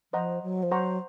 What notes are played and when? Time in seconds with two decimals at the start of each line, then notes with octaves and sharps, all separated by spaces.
0.13 F3 C5 D#5 F#5 A#5
0.43 F#3
0.63 F3
0.71 F#3 C5 F#5 A#5 C#6